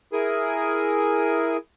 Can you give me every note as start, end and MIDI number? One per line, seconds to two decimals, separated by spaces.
0.13 1.57 64
0.13 1.57 68
0.13 1.57 70
0.13 1.57 80